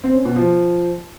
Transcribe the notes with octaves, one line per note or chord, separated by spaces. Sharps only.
C4
C#4
B2
F3